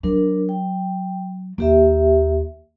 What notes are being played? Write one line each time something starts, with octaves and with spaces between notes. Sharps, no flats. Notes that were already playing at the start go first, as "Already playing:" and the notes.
F#3 D4 A#4
G5
D#2 A#3 G4 E5